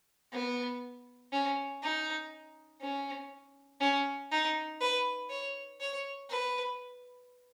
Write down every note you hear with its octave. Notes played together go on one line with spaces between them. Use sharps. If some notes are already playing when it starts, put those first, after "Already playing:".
B3
C#4
D#4
C#4
C#4
D#4
B4
C#5
C#5
B4